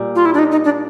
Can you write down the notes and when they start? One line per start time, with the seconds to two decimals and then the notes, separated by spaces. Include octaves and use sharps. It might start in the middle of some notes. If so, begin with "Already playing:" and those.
Already playing: A#2 G3
0.15 F4
0.25 E4
0.34 D4
0.39 D#4
0.52 D#4
0.64 D4